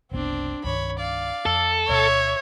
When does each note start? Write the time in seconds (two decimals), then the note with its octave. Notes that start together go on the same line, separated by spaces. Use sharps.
0.11 F#1 C2 B3 C4 D4
0.64 C2 G2 D#3 C#5 B5
0.99 D5 F5
1.46 F2 A4
1.89 D2 B2 C#5 E5